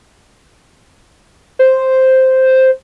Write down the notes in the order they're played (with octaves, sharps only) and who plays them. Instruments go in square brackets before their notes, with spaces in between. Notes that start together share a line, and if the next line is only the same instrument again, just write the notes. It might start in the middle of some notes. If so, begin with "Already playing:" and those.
[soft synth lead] C5